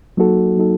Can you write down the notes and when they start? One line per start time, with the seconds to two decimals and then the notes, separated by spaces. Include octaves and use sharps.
0.17 F#3 A#3 D#4 F#4 A4
0.57 F#3 A#3 D#4 F#4 A4